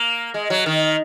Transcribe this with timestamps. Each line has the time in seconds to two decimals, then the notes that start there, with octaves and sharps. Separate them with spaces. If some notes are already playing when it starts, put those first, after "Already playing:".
Already playing: A#3
0.34 G#3
0.50 F#3
0.66 D#3